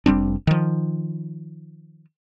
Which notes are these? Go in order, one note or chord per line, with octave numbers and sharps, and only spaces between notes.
F1 G3 C4 D4
D#3 F3